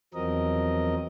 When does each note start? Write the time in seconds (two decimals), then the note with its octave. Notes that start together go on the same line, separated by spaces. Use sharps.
0.14 E2 F3 F#3 C4 A#4 D#5